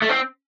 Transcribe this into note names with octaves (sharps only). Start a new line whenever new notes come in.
A3
C4